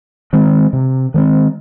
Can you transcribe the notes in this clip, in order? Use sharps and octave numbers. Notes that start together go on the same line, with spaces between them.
D#3 G#3 C4
C3
D#3 G#3 C4